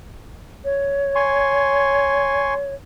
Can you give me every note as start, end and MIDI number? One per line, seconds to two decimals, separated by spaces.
0.65 2.74 73
1.15 2.54 80
1.15 2.54 84
1.15 2.54 85